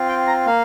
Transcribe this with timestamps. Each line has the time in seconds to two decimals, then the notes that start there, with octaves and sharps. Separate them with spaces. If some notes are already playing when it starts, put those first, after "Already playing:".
Already playing: C4 F4
0.09 G5
0.27 A#5
0.46 A#3 F5